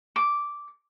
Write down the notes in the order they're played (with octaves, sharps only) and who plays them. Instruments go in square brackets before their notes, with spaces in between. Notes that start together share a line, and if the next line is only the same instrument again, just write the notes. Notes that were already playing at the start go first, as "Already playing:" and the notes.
[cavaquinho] D6